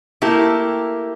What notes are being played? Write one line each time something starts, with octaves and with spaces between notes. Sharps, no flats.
A3 A#3 E4 G4